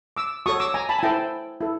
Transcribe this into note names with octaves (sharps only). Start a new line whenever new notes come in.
D6 E6
F#4 A4 C#5 C#6 D#6
D6 E6
G#5 A#5
A5 B5
G#5
E4 A4 C5 G5 A5
E4 A4